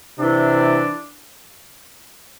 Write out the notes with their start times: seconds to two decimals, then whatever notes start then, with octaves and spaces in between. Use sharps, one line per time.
0.18 C3 E3 D4